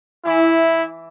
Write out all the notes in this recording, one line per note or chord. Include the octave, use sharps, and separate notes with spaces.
E3 E4 E5 D6